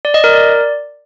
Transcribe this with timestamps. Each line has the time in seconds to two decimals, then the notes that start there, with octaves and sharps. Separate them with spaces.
0.05 D5
0.14 D#5
0.24 A#4
0.33 D5